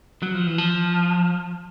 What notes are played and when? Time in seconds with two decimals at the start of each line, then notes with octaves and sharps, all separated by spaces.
0.23 F#3
0.34 F3
0.47 E3
0.58 F3